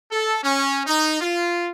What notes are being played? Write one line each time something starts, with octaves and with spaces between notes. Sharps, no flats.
A4
C#4
D#4
F4